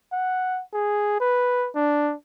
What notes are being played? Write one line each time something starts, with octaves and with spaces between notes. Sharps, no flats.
F#5
G#4
B4
D4